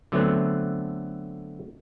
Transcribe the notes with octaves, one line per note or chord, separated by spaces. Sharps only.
D3 F#3 A3 B3 C4